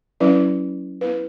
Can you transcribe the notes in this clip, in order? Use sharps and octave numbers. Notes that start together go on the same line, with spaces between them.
F#3 C#4 E4 B4 D5
B3 E4 B4